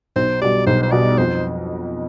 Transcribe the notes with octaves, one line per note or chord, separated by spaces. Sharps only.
B1 C5
B2 G3 D5
B1 C5
C5
B2 G3 D5
F2 C5